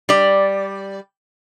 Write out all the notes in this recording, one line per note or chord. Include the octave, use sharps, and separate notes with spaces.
G3 D5